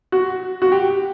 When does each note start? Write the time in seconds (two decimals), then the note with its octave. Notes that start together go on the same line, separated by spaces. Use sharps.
0.12 F#4
0.62 F#4
0.72 G4